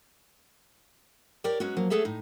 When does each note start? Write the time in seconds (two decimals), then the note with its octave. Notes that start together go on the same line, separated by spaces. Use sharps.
1.44 G4 A#4 C#5 D5 G5
1.60 F#3 G#3 B3 C#4 F#4
1.76 F3 F#3 A#3
1.90 A3 B3 G#4 A4 C#5 E5
2.05 A2 D#4